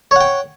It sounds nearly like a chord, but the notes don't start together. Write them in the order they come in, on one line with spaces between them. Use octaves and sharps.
C#5 F#5 G5